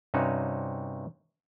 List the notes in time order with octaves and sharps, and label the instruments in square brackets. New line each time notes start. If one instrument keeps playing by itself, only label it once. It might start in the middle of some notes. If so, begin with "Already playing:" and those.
[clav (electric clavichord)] G2 C3 C#4 D#4 F#4